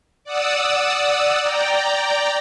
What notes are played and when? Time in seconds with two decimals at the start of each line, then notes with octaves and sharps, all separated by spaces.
0.24 D5 F#5 D#6 E6
1.42 D5 G5 A#5